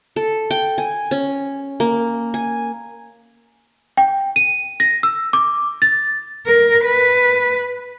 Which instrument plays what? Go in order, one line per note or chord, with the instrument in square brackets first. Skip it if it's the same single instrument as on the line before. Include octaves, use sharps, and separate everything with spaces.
[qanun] A4
G5
G#5
C#4
A#3
G#5
[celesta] G5
D#7
A#6
E6
D6
A6
[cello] A#4
B4